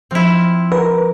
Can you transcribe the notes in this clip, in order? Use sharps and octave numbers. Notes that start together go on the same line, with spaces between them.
F3 C4 E4 C6 F6
A#4 B4